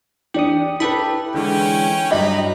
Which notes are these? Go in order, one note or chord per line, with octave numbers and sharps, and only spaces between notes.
E3 D4 G4 D#6 C#7
E4 G4 A4 B4 B5
D3 E3 G#3 C#4 G5
G2 F#3 D#4 D5 D#5 G5 B5